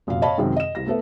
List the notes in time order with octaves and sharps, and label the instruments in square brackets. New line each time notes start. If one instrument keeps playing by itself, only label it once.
[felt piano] F1 F#2 A#2 F5
C#5 D#5 F5 A5 B5
F#2 C3 D#3 G#3
D#5 E7
C2 A#6
A3 B3 A4 B4 E5